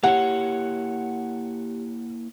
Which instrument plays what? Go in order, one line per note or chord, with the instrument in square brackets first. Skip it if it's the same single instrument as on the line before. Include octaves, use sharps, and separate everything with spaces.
[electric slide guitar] A#3 E4 C#5 [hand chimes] G4 [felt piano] F#5